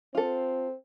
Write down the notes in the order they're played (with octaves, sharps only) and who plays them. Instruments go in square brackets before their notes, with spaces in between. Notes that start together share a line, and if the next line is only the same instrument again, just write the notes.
[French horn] C4 [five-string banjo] F4 A4